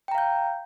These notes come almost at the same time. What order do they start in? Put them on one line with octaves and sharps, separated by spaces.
G5 A#5 F5 G6